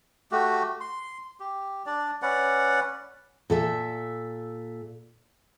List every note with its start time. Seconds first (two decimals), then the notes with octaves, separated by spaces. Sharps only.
0.32 A3 F#4 G4
0.81 C6
1.40 G4
1.86 D4 D5
2.22 C#4 B4 D5 F#5
3.50 A#2 A4 E5